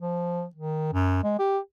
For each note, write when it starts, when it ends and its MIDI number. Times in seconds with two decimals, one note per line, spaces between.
0.01 0.45 53
0.56 0.92 51
0.93 1.23 42
1.24 1.36 56
1.39 1.59 67